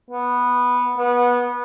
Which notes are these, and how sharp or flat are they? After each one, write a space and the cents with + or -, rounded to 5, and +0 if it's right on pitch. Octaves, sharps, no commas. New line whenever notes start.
B3 -5
B3 -20